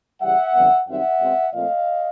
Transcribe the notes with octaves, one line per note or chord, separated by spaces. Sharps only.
C#3 E3 G3 E5 F#5
F2 D3 G3 B3
F#2 D#3 G3 C4 D#4 E5 F#5
B2 G#3 C4
A#2 F3 A3 C4 D#5 F5